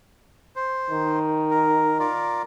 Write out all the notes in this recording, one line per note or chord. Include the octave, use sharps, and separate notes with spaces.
C5
D#3
A#4
F4 A#4 D5